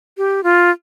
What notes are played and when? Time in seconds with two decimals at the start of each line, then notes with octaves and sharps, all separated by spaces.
0.18 G4
0.43 F4